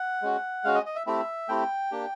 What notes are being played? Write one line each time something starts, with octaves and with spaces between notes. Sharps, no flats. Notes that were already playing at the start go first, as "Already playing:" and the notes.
Already playing: F#5
G#3 C#4 F#4
G#3 C#4 F#4 F5
D#5
D#5
E5
A3 C4 E4 G4 E5
A3 C4 E4 G4 G5
A#3 D4 G4